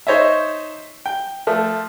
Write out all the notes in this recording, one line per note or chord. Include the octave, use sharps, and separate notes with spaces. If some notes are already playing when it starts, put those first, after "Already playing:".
D#4 C5 C#5 D#5 E5
G5
F3 A3